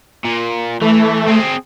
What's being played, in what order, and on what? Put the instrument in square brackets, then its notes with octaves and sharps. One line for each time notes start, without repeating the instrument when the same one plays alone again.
[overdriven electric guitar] A#2
[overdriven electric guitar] E3 [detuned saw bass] A3
[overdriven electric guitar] C4 G#4